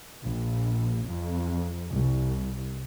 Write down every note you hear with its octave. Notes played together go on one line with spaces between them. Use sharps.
A#1
F2
C2